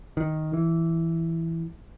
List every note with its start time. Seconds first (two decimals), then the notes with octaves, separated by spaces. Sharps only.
0.17 D#3
0.53 E3